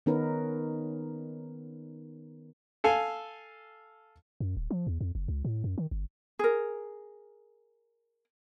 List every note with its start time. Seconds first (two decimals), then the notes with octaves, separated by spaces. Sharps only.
0.06 D#3 B3 C#4 D#4 A#4 B4
2.84 A4 F5 G#5
4.40 F#2
4.57 D1
4.71 F3
4.87 E2
5.01 F2
5.15 F#1
5.28 C#2
5.45 A2
5.64 F#2
5.78 D#3
5.91 G1
6.39 G#4 A#4